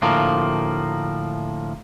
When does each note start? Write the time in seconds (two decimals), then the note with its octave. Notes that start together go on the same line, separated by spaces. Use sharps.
0.02 D2 A2 F3 A#3